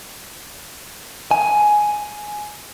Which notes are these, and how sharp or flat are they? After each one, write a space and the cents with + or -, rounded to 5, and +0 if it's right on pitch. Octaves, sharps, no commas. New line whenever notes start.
G#5 +10